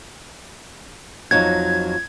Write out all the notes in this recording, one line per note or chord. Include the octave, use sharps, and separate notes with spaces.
F2 F#3 D#4 G#6